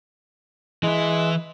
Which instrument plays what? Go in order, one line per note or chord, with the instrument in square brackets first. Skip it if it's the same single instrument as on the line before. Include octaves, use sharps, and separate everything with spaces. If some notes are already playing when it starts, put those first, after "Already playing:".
[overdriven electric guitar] E3 E4 [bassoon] G#3